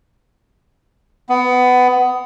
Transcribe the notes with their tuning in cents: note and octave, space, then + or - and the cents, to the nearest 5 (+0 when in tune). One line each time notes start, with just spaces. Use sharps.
B3 +20